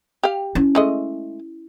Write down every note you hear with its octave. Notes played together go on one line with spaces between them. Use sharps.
G4 F5
C#4 E4
G#3 A3 D#5